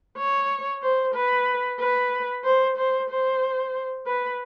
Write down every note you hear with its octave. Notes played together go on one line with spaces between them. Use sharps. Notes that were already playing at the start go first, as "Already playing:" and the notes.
C#5
C5
B4
B4
C5
C5
C5
B4